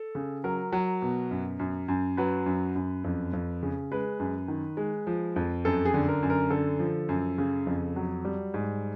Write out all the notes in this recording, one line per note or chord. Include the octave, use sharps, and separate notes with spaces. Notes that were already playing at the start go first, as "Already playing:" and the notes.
Already playing: A4
C#3
F#3 A#4
F#3
B2
F#2
F#2
F#2
F#3 B4
F#2
F#2
F2
F2
C#3
G#3 B4
F#2
D#3
G#3
F3
F2
F#2 A4
G#4
D3
A#4
F#2
A#4
D3 A4
F3
F#2
C#3
F2
F#3
G3
G#2